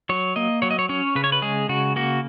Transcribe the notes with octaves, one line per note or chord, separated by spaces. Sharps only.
F#3 C#5
A#3 D#5
F#3 C#5
D#5
C#5
C#4 C#5
C#3 B4
C#5
B4
G#3 G#4
C#3 F#4
A#3 F#4